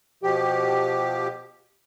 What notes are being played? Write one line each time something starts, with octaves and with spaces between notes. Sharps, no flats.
B2 F3 G4